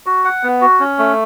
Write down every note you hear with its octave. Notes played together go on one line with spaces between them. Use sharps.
F#4
F#5
B3
F#4
C#4
A3